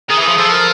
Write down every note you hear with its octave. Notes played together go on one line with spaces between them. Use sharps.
D#3 G#4
E3
F3 G#4
F3 A4
A#4